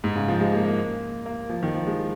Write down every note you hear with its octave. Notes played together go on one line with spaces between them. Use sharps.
G#2
C#3
F3
G#3
A#3
A#3
A#3
F3
D#3
F3
G#3